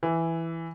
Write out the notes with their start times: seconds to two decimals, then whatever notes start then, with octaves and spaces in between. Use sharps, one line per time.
0.03 E3